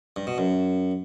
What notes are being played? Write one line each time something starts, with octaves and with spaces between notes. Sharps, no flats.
G2
B2
F#2